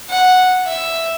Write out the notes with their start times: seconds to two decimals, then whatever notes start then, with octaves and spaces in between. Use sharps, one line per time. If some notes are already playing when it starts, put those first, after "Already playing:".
0.10 F#5
0.68 E5